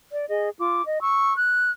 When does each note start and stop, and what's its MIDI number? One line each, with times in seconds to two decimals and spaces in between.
0.11 0.27 74
0.28 0.49 68
0.28 0.49 75
0.59 0.83 65
0.59 0.83 86
0.85 1.00 75
1.00 1.33 85
1.00 1.33 88
1.37 1.71 90